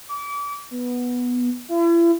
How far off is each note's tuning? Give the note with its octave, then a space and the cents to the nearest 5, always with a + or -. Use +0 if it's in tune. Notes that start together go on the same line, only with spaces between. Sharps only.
D6 -35
B3 -5
E4 +40